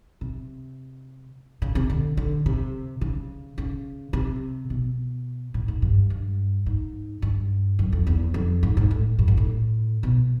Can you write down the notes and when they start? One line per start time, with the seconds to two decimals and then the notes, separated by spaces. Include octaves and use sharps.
0.21 C3
1.62 C#3
1.75 C3
1.90 D3
2.17 D3
2.46 C3
3.01 C#3
3.58 C#3
4.13 C3
4.70 B2
5.54 A2
5.68 G#2
5.82 G2
6.10 G2
6.66 G#2
7.22 G2
7.79 F#2
7.93 F2
8.07 E2
8.34 F2
8.63 G#2
8.77 G#2
8.91 A2
9.19 G2
9.28 G#2
9.37 A2
10.03 B2